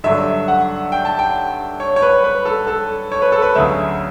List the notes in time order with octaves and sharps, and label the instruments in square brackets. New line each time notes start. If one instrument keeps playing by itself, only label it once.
[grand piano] G2 D3 F#3 E5
F#5
G5
A5
G5
C#5
C#5
B4
B4
A4
A4
C#5
B4
A4
B4
D2 C#3 F#3 E5